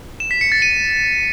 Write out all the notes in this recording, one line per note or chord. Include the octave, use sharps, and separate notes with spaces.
E7
B6
C#7
A6
D#7